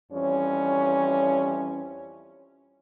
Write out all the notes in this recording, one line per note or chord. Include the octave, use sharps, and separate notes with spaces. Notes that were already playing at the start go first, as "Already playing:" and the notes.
F2 E3 G3 C#4 C#5